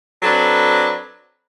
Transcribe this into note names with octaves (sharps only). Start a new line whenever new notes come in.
F#3 C4 D4 A4 B4